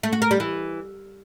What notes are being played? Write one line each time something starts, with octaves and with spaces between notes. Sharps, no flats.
A3
F#4
A#4
G3
E3